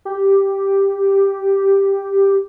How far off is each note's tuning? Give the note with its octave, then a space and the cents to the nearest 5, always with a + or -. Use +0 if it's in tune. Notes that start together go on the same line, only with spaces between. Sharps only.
G4 +0